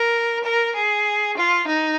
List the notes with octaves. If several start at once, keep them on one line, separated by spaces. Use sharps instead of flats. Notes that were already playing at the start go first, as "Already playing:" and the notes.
Already playing: A#4
A#4
G#4
F4
D#4